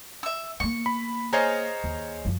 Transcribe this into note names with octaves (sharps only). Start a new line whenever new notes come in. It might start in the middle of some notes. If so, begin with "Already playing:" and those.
E5 E6
A#3 B3 C#6
B5
G#4 C5 C#5 D#5 F5 A#5
D#2
F#2 F3